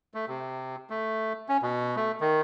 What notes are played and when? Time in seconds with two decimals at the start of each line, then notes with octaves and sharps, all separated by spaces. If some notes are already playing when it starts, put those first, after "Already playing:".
0.14 A3
0.28 C3
0.90 A3
1.49 C#4
1.62 B2
1.96 A3
2.21 D#3